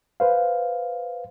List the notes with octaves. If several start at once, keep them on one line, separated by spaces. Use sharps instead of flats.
B4 C5 F5